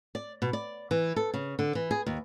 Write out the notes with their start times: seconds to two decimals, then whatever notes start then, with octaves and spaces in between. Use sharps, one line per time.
0.15 D5
0.42 B2
0.53 D5
0.91 E3
1.16 A4
1.34 C#3
1.59 D3
1.75 E3
1.91 G#4
2.06 D#2